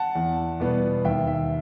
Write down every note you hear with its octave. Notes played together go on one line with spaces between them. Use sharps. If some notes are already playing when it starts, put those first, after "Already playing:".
Already playing: F#5 A5
E2
B2 G3 B3
D#2 E5 G5
E5